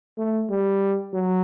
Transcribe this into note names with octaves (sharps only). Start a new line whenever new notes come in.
A3
G3
F#3